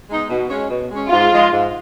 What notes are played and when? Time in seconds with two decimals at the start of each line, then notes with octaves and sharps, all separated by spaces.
0.10 G#3 B3 D#4
0.30 B2
0.50 G#3 C#4
0.70 B2
0.91 G#3 C#4
1.11 G#2 F4
1.31 F3 G#3
1.52 G#2